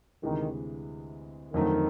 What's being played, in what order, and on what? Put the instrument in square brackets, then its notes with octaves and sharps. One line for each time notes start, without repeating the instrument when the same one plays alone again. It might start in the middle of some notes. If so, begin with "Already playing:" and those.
[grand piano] D2 C3 E3 G#3 [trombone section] D#3
[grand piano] F2 D3 F#3 A3 C4 [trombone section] D#3